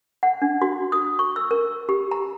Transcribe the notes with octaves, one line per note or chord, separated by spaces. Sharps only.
F#5
D4
F#4
D#6
C#6
E6
A#4
G4
A#5